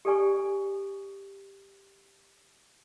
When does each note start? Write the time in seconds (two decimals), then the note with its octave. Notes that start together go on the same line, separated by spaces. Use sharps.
0.05 G4 A4 D5 G#5 C#6